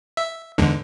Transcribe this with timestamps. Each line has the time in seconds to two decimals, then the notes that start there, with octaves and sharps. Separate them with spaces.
0.17 E5
0.58 E2 G#2 D3